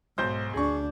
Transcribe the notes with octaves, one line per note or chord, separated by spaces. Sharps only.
B1 G#2 C5 G6
D2 D4 G#4 C#6